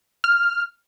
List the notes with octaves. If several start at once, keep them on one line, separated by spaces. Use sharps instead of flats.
F6